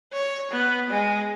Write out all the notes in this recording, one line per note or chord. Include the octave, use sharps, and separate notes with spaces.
C#5
B3
G#3